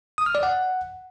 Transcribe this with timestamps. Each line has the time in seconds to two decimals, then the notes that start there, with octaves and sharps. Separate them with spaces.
0.18 D#6
0.26 F6
0.35 D5
0.43 F#5